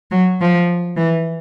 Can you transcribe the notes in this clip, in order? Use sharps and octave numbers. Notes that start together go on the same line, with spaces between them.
F#3
F3
E3